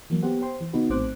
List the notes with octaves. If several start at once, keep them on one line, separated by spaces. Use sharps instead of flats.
E3 F#3 A#3
B3 G4 C5 F#5
C5 G5 C6
E3
C#3 B3 D#4 F#4 B4
A#1 A2 C4 C5 D6 F#6